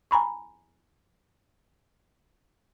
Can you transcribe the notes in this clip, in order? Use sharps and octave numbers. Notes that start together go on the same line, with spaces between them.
G#5 A#5 B5 C#6